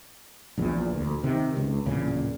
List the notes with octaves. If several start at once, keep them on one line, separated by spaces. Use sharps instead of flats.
A#1 E2 A#2
D2
C3 D#3
C#2
D1 E2 A#2 C#3